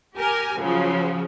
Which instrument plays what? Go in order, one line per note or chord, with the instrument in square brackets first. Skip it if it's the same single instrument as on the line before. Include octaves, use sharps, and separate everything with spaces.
[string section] G4 A#4 G#5
C#3 F3 F#3